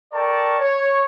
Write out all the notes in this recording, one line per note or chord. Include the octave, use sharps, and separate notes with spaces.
A4 A#4 D5 G5 A5 C#6
C#5